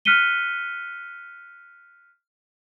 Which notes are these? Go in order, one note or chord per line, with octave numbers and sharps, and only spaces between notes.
F6 F#6 B6 C#7 D#7 G7